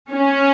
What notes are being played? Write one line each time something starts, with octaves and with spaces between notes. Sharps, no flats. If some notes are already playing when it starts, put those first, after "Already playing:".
C#4